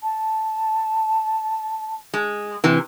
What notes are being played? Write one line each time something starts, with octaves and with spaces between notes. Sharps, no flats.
A5
G#3
C3 E3